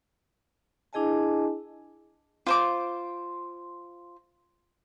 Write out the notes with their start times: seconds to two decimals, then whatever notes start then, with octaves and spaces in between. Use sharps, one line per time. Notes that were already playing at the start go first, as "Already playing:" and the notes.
0.93 D4 E4 G#4 D#5 G#5 A5
2.47 F4 C5 D6